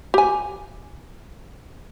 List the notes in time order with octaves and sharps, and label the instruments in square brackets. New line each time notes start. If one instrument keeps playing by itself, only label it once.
[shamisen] G4 G#5